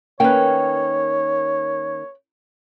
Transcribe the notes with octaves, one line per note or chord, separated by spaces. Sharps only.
D#3 A#3 C#4 B4 C#5 G5